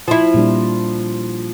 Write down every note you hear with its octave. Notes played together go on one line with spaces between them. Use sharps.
F3 E4
A#2 G3 D4